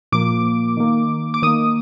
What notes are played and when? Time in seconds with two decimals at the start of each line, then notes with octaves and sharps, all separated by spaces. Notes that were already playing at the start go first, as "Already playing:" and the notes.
0.12 A#2 F3 A#3 D6
0.77 D#3 A#3
1.34 D6
1.42 D#3 A#3 D#6